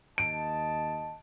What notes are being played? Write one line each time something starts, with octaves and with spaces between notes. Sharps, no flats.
D#2 D#5 A5 D7